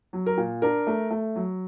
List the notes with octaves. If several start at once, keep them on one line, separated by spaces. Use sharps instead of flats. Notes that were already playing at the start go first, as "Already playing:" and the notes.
F#3
A#4
A#2
D4 A#4
A3
A3
F#3